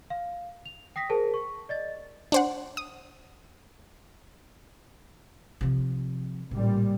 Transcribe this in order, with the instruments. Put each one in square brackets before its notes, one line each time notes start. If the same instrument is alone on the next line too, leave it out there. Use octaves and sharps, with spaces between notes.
[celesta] F5
F7
G5 D#6 A#6 B6
G#4 A#4 C5 A5
C#6
D5 D#5 A6
[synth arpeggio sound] D4 C5 F#5
D#6
[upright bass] C3 F3
[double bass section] A1 A#2 G3 [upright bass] C#3